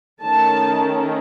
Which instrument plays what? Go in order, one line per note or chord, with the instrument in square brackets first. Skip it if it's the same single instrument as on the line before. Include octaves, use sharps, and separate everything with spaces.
[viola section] D#3 A3 C#4 A5